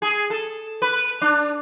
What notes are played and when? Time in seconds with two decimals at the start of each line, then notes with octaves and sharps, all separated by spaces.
0.02 G#4
0.30 A4
0.82 B4
1.22 D4